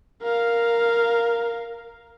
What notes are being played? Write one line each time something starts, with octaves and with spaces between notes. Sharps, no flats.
A#4 F5